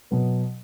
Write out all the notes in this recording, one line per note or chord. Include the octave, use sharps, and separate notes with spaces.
B2 F#3 B3